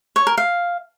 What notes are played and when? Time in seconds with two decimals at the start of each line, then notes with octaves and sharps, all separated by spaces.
0.16 C#5
0.27 A#4
0.37 F5